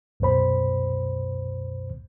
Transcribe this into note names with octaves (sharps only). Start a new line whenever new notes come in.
C2 F#2 B2 C5 B5